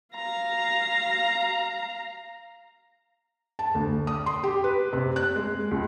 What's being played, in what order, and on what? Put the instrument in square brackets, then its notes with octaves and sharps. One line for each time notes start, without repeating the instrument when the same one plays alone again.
[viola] F5 A#5
[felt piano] A5
D2
D#6
C6
G4
B4
C3
F#6
G#3
C#2